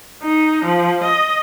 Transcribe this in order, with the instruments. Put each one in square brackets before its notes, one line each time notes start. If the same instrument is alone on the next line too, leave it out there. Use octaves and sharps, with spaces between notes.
[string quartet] D#4
F3
D#5